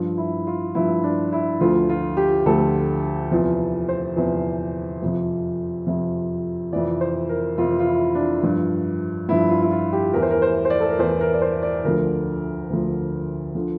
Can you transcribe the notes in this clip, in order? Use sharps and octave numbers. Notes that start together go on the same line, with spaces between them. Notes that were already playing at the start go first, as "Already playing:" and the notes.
Already playing: G2 F3
E4
F4
G2 F3 E4
D4
E4
D2 D3 F3 F4
F4
G4
D2 D3 F3 A4
E2 C3 F3
C5
E2 C3 F3
F2 C3 F3
F2 C3 F3
F2 C3 E3 D5
C5
A#4
F2 C3 E3 F4
F4
E4
D4
G2 F3
G2 F3 E4
F4
E4
F4
G4
E2 E3 A#4
C5
A#4
C5
C5
D5
A4
A#4
E2 E3 C5
A#4
D5
C5
D5
D2 D3 F3 A#4
D2 D3 F3
D3 F3